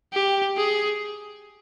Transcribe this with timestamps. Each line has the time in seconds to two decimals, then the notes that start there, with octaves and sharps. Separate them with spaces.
0.13 G4
0.57 G#4